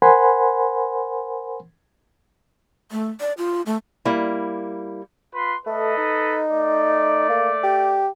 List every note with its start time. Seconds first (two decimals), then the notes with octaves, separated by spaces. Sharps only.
0.02 A#4 C5 F#5 G#5 B5 C6
2.92 A3
3.20 D5
3.38 F4
3.66 A3
4.05 G3 A#3 E4
5.33 F4 B4 C6
5.66 A3 A4 B4 D#5
5.97 D#4
6.50 A3 D5
7.29 A#3
7.63 G4